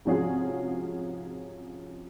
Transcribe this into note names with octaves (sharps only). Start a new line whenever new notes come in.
G#2 C3 F3 C#4 F#4 G#4